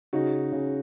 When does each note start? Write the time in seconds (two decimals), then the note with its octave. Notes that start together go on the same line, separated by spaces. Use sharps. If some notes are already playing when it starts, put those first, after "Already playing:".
0.13 C#3 D#4 F#4
0.52 C#3